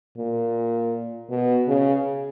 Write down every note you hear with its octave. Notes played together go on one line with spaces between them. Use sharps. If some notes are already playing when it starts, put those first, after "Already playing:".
A#2
B2
C#3